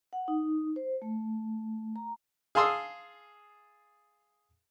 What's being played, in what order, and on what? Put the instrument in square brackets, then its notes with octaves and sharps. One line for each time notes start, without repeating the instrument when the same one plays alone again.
[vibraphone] F#5
D#4
C5
A3
A#5
[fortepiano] G#4 F5 A5 C6 D#6 E6